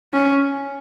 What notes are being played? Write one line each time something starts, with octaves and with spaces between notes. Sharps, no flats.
C#4